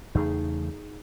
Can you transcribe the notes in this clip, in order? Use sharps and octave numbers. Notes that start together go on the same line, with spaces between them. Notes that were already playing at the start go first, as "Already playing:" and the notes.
E2 C#3 A3 D#4 G#4